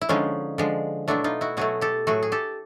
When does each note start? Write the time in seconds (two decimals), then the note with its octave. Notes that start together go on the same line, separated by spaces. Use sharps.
0.01 E4
0.09 D3 F3 G#3 C#4 D#4
0.58 D3 F3 G#3
1.08 B2 F#3 A3 D4 E4
1.24 D#4 F4
1.41 E4 F#4
1.57 B2 F#3 A3 F#4 G#4
1.81 G4 A4
2.07 A2 F#3 A3 F#4 G#4
2.23 G#4
2.32 G4 A4